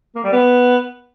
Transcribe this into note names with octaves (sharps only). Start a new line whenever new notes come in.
A#3
G3
B3